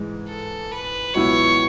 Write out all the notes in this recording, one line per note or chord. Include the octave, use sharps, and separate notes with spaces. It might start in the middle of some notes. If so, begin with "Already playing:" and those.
Already playing: G#2 E3 G#3
A4
B4
C#2 B2 F#3 B3 E4 C#5